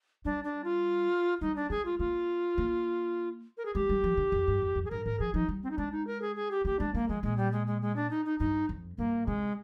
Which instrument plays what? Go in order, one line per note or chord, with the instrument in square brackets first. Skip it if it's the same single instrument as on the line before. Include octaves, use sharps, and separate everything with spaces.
[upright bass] G3 [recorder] D4
[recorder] D4
F4
[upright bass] G3 [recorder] D#4
[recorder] D4
[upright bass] G#3 [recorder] G#4
[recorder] F4
[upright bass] A#3 [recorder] F4
[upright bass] A#3
[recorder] A#4
G#4
[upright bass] G#3 [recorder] G4
[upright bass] G3
F3
D3
F2
G2
F2
F2
[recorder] G#4
[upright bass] G2 [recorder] A#4
[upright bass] G#2 [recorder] A#4
[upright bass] F3 [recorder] G#4
[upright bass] F3 [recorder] D#4
[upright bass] G3
[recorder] C4
D#4
[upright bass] G#3 [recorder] D4
[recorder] D#4
A#4
G#4
G#4
G4
[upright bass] A#3 [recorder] G4
[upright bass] G#3 [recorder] D4
[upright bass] G#3 [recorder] A#3
[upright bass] F3 [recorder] G#3
[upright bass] A#2 [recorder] G#3
[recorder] G3
G#3
G#3
G#3
D4
D#4
D#4
[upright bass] G2 [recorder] D#4
[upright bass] F2
[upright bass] G2 [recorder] A#3
[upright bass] C3 [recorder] G#3